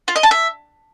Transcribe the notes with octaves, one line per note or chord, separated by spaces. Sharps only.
F4
D#5
A5
E5